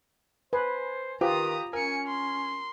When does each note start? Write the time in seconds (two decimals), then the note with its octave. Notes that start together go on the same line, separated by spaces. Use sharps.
0.53 B4 C5 G#5
1.21 D#3 F4 G4 B4 A#5 D#6
1.73 C#4 A#4 G#5 C#7
2.07 C6